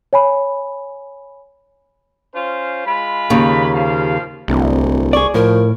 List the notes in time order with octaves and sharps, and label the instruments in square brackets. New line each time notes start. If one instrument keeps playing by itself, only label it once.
[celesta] C#5 G#5 B5
[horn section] C#4 F4 C5
G#3 F4 B5
[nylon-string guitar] D#2 C#3
[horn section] F3 G3 F5
[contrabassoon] D1 [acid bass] C2
[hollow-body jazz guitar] G#4 D5 [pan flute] C#6
[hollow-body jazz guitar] A2 [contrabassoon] F3 [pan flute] A#4